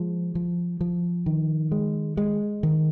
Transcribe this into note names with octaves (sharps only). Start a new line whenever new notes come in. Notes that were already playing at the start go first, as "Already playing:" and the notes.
Already playing: F3 G#3
F3
F3
D#3
G#3
G#3
D#3